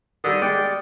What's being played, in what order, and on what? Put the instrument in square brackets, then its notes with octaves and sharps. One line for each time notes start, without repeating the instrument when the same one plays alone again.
[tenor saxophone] D3 [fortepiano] D#3 G3 [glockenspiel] D#6
[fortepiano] G#3 [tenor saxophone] D5 [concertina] G5 [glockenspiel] F6 C#7